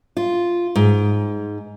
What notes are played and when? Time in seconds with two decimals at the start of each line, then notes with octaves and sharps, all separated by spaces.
0.17 F4
0.76 G#2